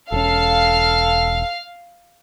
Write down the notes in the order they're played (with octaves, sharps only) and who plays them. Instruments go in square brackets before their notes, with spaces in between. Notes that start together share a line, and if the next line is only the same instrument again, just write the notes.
[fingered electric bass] E1 C#4 [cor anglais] A4 [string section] F5